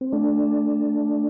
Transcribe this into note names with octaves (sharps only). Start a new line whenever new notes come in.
C4
A3 D4